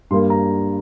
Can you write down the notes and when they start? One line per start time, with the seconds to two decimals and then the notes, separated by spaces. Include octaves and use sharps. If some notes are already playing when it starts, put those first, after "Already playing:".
0.11 G2 G3 A#3 C6
0.30 A#5